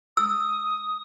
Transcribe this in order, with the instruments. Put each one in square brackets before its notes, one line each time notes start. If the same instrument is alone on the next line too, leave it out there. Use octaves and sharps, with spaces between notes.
[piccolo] D#6 [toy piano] E6